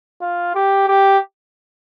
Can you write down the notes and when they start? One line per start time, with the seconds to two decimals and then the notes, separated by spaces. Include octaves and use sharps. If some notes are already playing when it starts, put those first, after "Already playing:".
0.21 F4
0.55 G4
0.88 G4